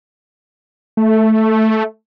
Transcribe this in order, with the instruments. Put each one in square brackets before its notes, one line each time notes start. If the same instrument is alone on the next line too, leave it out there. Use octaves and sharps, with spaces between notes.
[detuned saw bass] A3